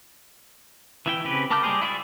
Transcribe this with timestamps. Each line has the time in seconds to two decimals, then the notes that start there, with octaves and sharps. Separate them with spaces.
1.06 E3 E4 G5
1.25 C#3 C4 G4 B4
1.50 A#3 A5 D6 F6 G6
1.63 G3 G#3 G4 G#4 C5
1.81 E4 F#4 G#4 D5 E5